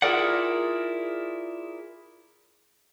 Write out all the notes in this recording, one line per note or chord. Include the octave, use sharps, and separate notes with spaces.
E4 F4 G#4 A#4 D5 F#5